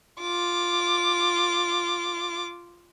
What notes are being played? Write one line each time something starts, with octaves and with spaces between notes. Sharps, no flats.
F4 D6